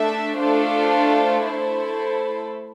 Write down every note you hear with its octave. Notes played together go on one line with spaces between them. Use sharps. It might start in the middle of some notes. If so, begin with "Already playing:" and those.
Already playing: A3 D4 A4 E5
A3 D4 F4 A4 C5
A3 E4 A4 C5